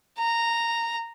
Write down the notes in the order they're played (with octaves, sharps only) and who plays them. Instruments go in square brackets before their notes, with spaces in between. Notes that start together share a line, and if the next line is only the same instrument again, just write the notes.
[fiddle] A#5